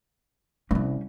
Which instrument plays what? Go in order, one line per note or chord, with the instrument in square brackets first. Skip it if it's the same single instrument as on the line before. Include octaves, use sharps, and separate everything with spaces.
[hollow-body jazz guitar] C2 G2 [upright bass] C#4